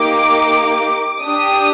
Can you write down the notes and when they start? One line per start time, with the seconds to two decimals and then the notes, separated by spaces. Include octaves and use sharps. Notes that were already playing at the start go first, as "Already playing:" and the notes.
Already playing: A#3 D#4 G4 D6
1.21 D4 G4 D#6